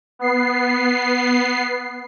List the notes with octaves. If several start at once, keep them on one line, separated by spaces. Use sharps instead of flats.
B3 C7